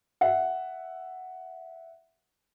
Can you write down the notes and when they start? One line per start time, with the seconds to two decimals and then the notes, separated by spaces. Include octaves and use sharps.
0.21 E5 F#5